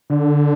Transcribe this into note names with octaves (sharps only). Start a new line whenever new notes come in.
D3